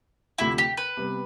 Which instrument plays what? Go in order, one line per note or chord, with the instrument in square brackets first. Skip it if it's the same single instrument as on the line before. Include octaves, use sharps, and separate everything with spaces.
[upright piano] D2 C3 F3 [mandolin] E4
[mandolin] G4
B4
[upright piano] C3 G3 B3